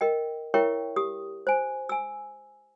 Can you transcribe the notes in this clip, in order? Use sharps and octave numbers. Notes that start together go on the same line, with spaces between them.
A#4 D#5 G5
E4 A#4 C#5 E5 G5 C#6
G4 D#6
C5 G#5
G#5 E6